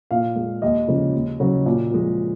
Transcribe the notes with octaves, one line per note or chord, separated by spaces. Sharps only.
A#2 F5
G#3
D#2 D#5
C#3 F3 G#3
D#2
C#3 F#3
A#2 F#4
F3 G#3